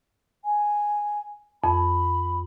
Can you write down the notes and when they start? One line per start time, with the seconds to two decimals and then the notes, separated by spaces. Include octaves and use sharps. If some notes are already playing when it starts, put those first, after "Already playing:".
0.45 G#5
1.64 F2 B5